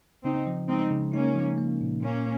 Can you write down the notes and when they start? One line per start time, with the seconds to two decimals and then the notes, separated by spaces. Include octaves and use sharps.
0.23 C#3 C4 D#4
0.47 F3
0.68 G#3 C4 D#4
0.91 C#3
1.13 A#3 C#4 D#4
1.35 F3
1.58 A#3
1.81 A#2
2.02 A#2 A#3 C#4